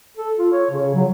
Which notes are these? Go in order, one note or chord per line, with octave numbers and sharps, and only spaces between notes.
A4
F4
C#5
C#3
F#3